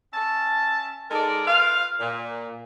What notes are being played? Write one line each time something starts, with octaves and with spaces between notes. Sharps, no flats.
C#4 E5 A5
G#3 D#4 A4 A#4 D5
F4 B4 F5
A#2